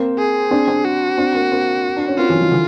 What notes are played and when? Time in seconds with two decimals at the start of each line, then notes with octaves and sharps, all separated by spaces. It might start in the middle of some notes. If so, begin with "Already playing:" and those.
Already playing: A#3 C4
0.18 G#4
0.51 C4 D4
0.68 C4 D4
0.85 F#4
1.18 C4 D4
1.35 A#3 C4
1.52 A#3 C4
1.96 D4
2.07 C#4
2.18 A#3 C4 F4
2.29 E3 F#3
2.41 D#3 F3
2.51 D3 E3